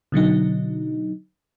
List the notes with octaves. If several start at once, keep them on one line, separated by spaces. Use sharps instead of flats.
B2 D3 F#3 D#4